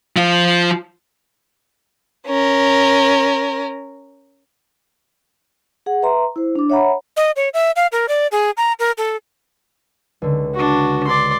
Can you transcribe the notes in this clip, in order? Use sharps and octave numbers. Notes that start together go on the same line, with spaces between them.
F3 F4
C#4 A#4
G#4 F#5
B4 E5 A#5 C6
E4 C5
D4 D6
C#5 E5 F#5 A#5 B5
D#5
C#5
E5
F5
A#4
D5
G#4
A#5
A#4
A4
C#2 D3
D4 F#4
D5 C6